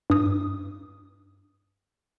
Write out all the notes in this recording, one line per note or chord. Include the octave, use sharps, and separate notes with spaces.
G2 D#6